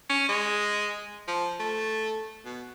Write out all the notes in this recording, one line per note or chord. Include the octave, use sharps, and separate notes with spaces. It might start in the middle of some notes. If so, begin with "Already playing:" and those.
C#4
G#3
F3
A3
B2